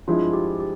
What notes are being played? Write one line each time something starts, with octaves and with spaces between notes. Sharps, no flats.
G2 F3 G#3 E4 F4
G4
G4